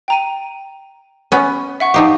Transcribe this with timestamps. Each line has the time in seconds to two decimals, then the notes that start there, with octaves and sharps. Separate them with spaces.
0.08 G5 A#5 D#7
1.32 B3 C#4
1.80 E5 F#5 C#6
1.94 F3 D#4 G4 F5